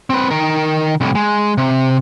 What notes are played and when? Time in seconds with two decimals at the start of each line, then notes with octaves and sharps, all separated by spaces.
0.10 C4 B4
0.31 D#3 A#4
1.01 C2 A2
1.15 G#3
1.58 C3